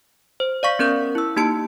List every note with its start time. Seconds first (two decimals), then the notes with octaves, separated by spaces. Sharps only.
0.40 C5
0.63 D5 F5 C#6 B6
0.79 B3 C#4 A#4 G6
1.15 E4 E6
1.36 A#3 D#4 G4 A5 D7